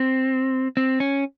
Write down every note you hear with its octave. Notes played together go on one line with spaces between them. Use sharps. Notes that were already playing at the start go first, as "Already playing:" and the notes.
Already playing: C4
C4
C#4